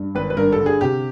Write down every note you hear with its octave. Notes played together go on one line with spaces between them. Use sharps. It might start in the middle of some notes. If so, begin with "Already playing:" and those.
Already playing: G2
G#1 B4
B4
G2 A#4
A4
D3
G#4
C3 G4